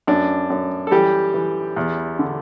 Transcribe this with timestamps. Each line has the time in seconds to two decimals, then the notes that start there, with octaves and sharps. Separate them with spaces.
0.07 F#2 D4
0.50 F#2
0.87 A4
0.91 E3 G3 G4
1.34 E3
1.76 E2
2.19 D3